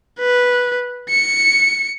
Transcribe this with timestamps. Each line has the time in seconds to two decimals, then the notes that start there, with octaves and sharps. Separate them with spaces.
0.19 B4
1.09 C#7